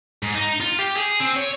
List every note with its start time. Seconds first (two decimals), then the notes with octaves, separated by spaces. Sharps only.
0.23 G#2
0.35 D#4
0.61 F4
0.79 G4
0.96 G#4
1.20 C4
1.36 C#5